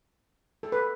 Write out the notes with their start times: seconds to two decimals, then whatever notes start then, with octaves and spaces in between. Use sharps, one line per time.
0.63 A4
0.72 B4